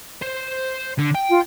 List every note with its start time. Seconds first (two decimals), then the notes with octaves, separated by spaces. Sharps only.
0.22 C5
0.99 D3
1.15 G5
1.29 F4